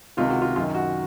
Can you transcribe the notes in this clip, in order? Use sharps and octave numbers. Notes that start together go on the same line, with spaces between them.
C#2 C3 D#3 F4
F#4
F4
F#2 D#3 F4
F#4